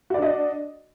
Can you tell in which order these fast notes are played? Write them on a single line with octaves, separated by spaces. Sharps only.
F#4 D5 D4 D#5